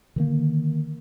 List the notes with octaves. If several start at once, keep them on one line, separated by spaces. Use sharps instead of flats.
D3 D#3 A#3